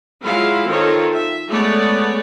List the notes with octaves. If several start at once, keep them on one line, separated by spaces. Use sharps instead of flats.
F#3 G#3 E4 F4 F5
D#3 C4 F4 A4 C#5
E5
G#3 A3 B3 C#5 D5